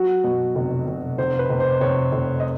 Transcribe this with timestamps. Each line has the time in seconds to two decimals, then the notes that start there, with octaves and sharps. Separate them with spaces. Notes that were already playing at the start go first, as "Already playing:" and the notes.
Already playing: F#3 F#4
0.24 B2
0.55 F1
0.87 F1
1.18 F1 C5
1.39 B4
1.49 F1
1.60 C5
1.81 F1 C#5
2.12 F1
2.40 D#5